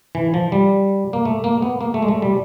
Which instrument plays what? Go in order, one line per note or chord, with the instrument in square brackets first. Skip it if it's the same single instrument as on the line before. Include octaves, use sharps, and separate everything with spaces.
[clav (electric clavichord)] E3
F3
G3
A#3
A3
A#3
B3
A#3
A3
G#3
A3
G3